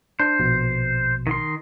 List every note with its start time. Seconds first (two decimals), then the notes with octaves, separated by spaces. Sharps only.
0.20 D4 C5
0.40 A#1 B2
1.27 D#3 C6